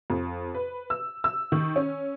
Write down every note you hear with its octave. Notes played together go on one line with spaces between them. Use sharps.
F2
B4
E6
E6
D#3
C#4